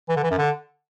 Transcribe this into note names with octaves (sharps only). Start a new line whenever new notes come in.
E3
D3
E3
F#2
D3